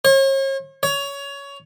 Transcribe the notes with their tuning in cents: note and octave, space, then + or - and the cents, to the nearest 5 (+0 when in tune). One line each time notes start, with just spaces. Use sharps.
C#5 -40
C#5 +20